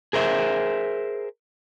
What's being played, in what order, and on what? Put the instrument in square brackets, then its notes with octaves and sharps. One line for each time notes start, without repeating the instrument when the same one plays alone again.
[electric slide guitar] G#4 A#4 C5 E5